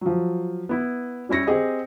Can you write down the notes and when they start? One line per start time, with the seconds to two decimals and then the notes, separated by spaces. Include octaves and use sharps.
0.01 F3 F#3
0.69 B3 E4
1.29 G3 C#4 E4 A#6 C#7
1.47 C4 G4 G#4 D#5